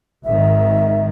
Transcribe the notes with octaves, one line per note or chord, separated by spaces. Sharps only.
G#1 G#2 D#3 E5